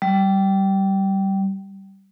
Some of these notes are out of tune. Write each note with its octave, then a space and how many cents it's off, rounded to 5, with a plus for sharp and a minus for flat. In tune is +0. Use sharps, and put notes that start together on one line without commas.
G3 -15